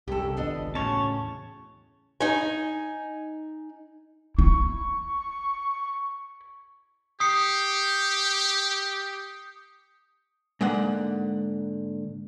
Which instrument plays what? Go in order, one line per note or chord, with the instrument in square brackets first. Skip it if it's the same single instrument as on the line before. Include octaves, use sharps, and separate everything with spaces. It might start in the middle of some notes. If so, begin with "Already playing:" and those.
[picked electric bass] C2 F#2 C3 [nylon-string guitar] G4 A4
[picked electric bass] G#1 C#2 [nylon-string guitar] B3 D4 D#5
[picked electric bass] E2 A2 C#3 [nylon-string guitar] C#4 F#4 [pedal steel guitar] C#5 A5
[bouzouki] D#4 G#5
[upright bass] E4 [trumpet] C#6
[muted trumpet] G4 [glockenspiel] D#6 C7 C#7
[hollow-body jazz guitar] G#2 D3 G#3 A#3 F#5